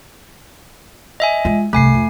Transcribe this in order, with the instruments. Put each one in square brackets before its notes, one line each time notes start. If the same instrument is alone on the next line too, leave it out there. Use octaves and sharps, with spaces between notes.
[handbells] D#5 E5 G#5
[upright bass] G#3 F4
[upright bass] C2 G2 [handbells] A3 G#5 C7
[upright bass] F2